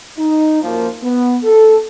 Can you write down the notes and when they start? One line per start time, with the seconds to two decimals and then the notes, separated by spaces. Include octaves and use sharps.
0.17 D#4
0.61 F#2 F3 A#3
1.02 B3
1.43 A4